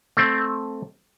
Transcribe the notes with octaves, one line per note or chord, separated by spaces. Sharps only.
A3 C4